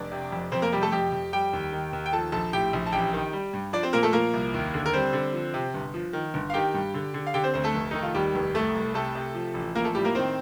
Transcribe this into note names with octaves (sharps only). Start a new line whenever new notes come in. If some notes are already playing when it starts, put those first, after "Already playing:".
Already playing: F1 D4 D5
C3
F2
F2 C4 C5
A#3 A#4
C3 G3 G4
A3 A4
F2 G4 G5
F2
G3 G4 G5
D#2
D#3
D#2
G5
F3 A4 A5
A#1 A4 A5
A2 G4 G5
A#1
A5
A1 G4 G5
D#3
G3
G2
F3 D4 D5
C4 C5
A#2 A#3 A#4
A3 A4
F3 A#3 A#4
C2
D#2
D3
A#4
G3 C4 C5
D3
F3
C3
G1
F3
D#3
G1
F5
D#3 G4 G5
G2
D3
D3
F5
D3 G4 G5
C4 C5
D2 C4 C5
A3 A4
F1
D#3 D#4
F4
D#2 G3 G4
F1
C2 A3 A4
C2
C3 A3 A4
C3
F3
A1
F3 A#3 A#4
A3 A4
A2 G3 G4
A#3 A#4
D#3 C4 C5